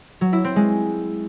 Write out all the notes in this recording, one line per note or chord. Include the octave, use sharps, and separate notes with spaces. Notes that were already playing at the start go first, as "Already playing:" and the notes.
F#3
E4
C4
G#3